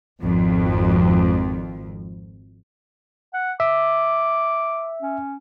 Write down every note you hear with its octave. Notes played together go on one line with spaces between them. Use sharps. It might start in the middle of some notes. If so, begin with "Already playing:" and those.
G#1 F2
F#5
E5 D6
C#4